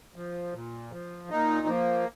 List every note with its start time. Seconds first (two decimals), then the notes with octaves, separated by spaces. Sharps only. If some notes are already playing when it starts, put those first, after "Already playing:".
0.16 F3
0.54 A#2
0.92 F3
1.30 A#2 D#4
1.67 F3 A#3